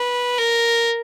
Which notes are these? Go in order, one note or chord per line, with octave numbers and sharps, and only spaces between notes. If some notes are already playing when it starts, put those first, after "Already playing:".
Already playing: B4
A#4